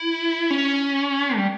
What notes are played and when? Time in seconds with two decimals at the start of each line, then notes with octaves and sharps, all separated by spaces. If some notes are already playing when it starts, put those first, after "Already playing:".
Already playing: E4
0.50 C#4
1.36 G3